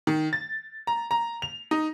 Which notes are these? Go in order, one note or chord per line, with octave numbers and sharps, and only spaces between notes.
D#3
A6
A#5
A#5
F7
D#4